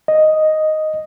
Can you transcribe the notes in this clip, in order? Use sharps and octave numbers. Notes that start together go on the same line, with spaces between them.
D#5